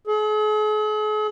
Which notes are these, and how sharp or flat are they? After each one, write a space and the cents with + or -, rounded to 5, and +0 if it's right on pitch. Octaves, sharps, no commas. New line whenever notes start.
G#4 +45